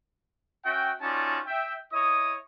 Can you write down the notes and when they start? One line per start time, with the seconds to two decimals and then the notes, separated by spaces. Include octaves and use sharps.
0.65 C#4 F#4 E5 G5
1.01 C#4 D#4 F4 F#4 D5 A5
1.47 E5 G5
1.92 E4 C#5 D#5 D#6